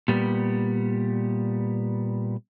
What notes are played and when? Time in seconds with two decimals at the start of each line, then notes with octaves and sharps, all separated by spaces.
0.08 A#2 G3 B3